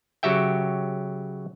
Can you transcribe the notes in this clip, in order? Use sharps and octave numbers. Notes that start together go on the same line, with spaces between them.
C#3 F#3 F#4 G4 E5 G5